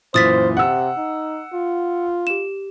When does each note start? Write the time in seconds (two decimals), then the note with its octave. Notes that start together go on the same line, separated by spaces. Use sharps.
0.14 F#2 A#2 E3 C5 D#6 A6 B6
0.57 C3 F#5 E6
0.98 D#4
1.53 F4
2.27 G4 E7